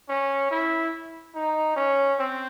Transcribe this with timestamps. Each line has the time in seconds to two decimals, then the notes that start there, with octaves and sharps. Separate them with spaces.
0.09 C#4
0.51 E4
1.35 D#4
1.76 C#4
2.19 C4